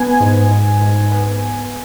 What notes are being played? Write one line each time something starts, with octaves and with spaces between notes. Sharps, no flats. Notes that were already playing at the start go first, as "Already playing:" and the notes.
Already playing: B3 G#5
G#2
G#2
G#2
B3